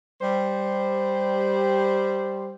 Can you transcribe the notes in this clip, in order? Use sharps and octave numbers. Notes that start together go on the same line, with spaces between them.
G3 C5